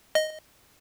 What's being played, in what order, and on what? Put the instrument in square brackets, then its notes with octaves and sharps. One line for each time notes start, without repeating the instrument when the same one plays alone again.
[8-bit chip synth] D#5